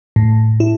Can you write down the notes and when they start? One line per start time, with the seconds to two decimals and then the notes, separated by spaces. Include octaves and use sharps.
0.16 A2
0.60 E4